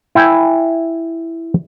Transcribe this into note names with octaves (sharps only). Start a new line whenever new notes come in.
E4 G5 G#5